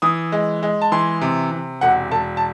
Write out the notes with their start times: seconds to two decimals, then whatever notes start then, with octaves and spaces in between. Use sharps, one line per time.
0.02 E3 D#6
0.32 G#3
0.63 G#3
0.82 A5
0.92 E3 C6
1.21 C3
1.51 C3
1.81 E1 F#5
2.11 E1 A5
2.37 A5